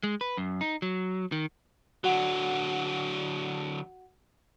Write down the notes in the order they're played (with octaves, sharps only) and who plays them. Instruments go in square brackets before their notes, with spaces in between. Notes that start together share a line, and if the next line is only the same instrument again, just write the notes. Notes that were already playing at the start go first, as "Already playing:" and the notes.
[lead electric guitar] G#3
B4
F#2
D#4
F#3
D#3
[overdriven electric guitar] D3 F#3 [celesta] F#4 F#5